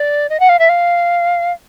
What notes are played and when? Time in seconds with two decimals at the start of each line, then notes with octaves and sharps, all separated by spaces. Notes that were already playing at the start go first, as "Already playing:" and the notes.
Already playing: D5
0.29 D#5
0.40 F#5
0.49 F5
0.59 E5
0.69 F5